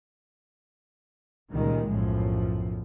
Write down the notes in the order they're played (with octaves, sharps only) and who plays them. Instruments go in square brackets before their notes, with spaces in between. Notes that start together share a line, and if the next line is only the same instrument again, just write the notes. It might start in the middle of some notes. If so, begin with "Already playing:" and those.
[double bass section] C#2 A#2 D#3 G3 G#3
B1 F#2 A2 F3